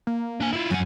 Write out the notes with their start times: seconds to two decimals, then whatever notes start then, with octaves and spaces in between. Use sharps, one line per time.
0.07 A#3
0.40 D4 G#5
0.53 E4 F4
0.70 F#2 F#5 G#5